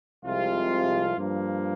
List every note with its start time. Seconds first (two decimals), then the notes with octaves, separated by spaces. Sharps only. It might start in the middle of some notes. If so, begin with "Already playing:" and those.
0.25 C2 C3 F3 G#3 F4
1.17 G2 F3 A#3